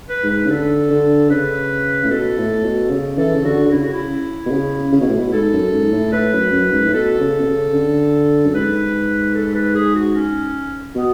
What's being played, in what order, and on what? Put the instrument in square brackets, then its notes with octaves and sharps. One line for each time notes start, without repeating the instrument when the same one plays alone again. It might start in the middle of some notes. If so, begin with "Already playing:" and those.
[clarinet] B4
[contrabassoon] G#2
[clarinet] B4
[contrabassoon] C#3
[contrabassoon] D3 [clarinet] A4
[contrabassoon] D3
[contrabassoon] C#3 [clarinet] B4
[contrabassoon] A2
[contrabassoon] B2 [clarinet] A4
[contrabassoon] A2
A2
B2
C#3
[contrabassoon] E3 [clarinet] A4
[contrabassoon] C#3
[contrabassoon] D3 [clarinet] F#4
[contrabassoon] D3
[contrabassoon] C#3 [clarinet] E4
[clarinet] F#4
E4
[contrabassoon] B2
C#3
C#3
B2
A2
B2
[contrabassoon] G#2 [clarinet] A4
[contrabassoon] F#2
G#2
A2
[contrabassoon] A2 [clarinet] B4
[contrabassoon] F#2
F#2
G#2
A2
[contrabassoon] B2 [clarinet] A4
[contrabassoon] C#3
B2
C#3
D3
F#2
[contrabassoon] G#2 [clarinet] B4
[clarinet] A4
B4
G#4
F#4
C#4
[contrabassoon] B2 [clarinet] B3